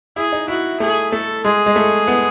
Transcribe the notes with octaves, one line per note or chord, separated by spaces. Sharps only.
E4 G#4
D#4
E4 F#4
A3 G#4
A3 A4
G#3 G#4
G#3
A3
B3